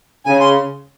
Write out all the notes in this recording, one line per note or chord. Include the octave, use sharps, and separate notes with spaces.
C#3 G#5
C6